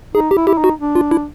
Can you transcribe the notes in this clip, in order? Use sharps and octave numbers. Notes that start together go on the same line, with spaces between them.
D#4 G#4
G4
E4
E4 G4
D#4
F#4
D4
F4
E4